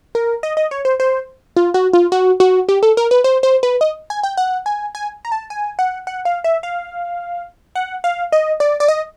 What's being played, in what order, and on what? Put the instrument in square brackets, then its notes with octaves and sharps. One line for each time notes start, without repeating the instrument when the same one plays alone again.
[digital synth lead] A#4
D#5
D#5
C#5
C5
C5
F4
F#4
F4
F#4
F#4
G4
A4
A#4
B4
C5
C5
B4
D#5
G#5
G5
F#5
G#5
G#5
A#5
A5
G#5
F#5
F#5
F5
E5
F5
F#5
F5
D#5
D5
D5
D#5